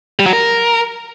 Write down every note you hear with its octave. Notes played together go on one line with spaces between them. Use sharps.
G3
F#3
A#4